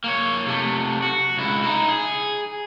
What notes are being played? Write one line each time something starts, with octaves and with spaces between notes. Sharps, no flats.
A#3 C#5
C3 A3
F#4
C#2 E4
D#4 E4
G#4